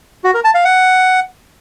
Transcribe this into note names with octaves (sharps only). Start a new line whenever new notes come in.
F#4
A#4
A5
F5
F#5